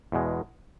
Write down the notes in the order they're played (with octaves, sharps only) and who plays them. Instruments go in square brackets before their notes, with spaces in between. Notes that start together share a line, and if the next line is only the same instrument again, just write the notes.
[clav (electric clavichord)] E2 B2 G#3